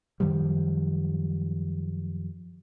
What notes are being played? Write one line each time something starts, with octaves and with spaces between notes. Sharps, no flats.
F#2 D#3 F3 G3